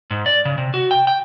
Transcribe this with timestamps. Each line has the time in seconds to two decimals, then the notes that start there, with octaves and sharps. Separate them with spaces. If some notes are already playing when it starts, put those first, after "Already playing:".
0.11 G#2
0.26 D5
0.45 C#3
0.58 C3
0.74 F#4
0.91 G5
1.07 G5